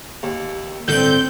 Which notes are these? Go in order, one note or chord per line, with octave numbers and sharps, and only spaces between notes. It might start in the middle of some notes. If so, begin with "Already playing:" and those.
D#2
G1 A2 D3 C4 A4 D5 G6